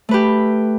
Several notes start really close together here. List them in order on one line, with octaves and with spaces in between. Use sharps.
A3 B4 G4